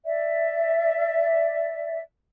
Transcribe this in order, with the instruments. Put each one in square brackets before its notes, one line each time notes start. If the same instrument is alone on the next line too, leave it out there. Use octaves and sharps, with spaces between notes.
[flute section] D5 E5